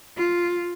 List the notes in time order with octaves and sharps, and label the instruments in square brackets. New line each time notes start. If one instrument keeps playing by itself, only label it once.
[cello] F4